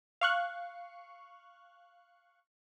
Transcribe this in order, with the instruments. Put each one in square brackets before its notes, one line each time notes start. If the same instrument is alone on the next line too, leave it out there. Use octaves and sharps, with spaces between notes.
[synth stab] F5 C#6 F#6